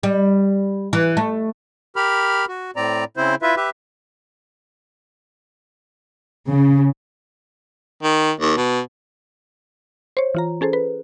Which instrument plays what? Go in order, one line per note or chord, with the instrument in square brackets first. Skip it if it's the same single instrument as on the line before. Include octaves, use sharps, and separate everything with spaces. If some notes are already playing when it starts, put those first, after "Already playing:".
[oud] G3
E3
A3
[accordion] G4 A#4 B5 F6
F#4
A2 C4 D5 A#5
C#3 C4 E4 C5
E4 F4 B4 E5
G4 B4 E5
[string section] C#3
[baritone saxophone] D#3
D#2
B2
[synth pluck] C5 C#5
E3 F4 A#5
C#4 G#4 A4 C5
B4